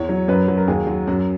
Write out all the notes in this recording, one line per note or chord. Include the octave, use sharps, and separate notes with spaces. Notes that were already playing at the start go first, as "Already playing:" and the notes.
Already playing: E2 C#5
F#3
F#2 B4
F#3
A#4
D#2 G#4
F#3
F#2 F#4